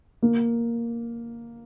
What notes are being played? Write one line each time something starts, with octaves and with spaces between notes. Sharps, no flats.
A#3